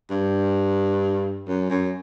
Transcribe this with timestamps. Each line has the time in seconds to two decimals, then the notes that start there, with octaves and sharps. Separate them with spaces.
0.10 G2
1.48 F#2
1.70 F#2